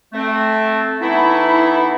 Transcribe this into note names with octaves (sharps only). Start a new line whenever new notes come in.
A3 C4
E3 A3 B3 D#4 E4